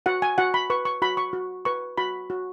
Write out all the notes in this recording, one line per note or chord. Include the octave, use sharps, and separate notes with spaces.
F#4 F#5
G#5
F#4 F#5
B5
B4 C#6
C#6
F#4 B5
C#6
F#4
B4 C#6
F#4 B5
F#4